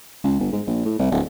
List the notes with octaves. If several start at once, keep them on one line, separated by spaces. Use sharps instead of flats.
C#2
G1
G#2
A#1
A2
C2
D1